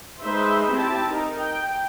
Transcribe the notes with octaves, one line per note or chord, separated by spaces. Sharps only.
G#3 D#4 B4 C5 E5 C6
C4 E4 G4 E5 A5
D#4 A#4
G5